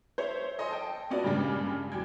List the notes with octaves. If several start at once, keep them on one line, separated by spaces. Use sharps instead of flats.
C5 C#5 E5
A4 D#5 G#5 C6
G5 A5
C#4 F4 F#4 B4 D5 D#5
G2 A#2 C#3 G3 G#3
E2 F#3 G5 G#6